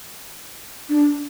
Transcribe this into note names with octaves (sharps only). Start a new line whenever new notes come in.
D4